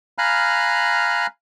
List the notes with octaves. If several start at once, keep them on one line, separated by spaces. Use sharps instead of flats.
F5 G#5 A#5 B5 F6 F#6